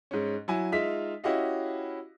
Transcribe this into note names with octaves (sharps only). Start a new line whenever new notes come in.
G#2 C#4
F#3 E4 G#5
G#3 D#4 F4 E5 B6
C#4 E4 F#4 G4 D#5 F5